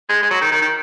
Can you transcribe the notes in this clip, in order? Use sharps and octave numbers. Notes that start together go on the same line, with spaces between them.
G#3
G#3
F#3
D#3
D#3
D#3